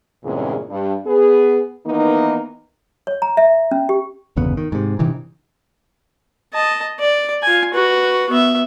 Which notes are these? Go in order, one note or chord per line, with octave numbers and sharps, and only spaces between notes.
E2 G2 A#2 C#3 G#3 C4
G2
B3 G#4 B4
D#3 E3 A#3 B3 D#4
C#5
A#5
E5
C#4
G4
G1 E2 C#3 B3
D#3
G#2 C3
G2 C3 D#3 E3
D#5 A5
D5
F4 G#5
F#4 B4
B3 E5